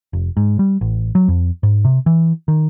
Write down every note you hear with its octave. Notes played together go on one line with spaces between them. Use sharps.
F1
G#2
G3
A1
F#3
F2
G#2
C3
E3
D#3